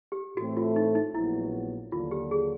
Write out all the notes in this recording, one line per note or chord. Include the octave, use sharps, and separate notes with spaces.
G4
A2 E3 A3 C4 F#4
F4
D#4
D#4
A#1 A#2 F#3 B3 E4
D#2 D3 F#3 A#3 D4 F4
G4
G#4